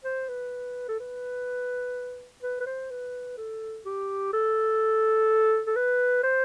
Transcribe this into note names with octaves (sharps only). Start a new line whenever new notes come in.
C5
B4
A4
B4
B4
B4
C5
B4
A4
G4
A4
A4
B4
C5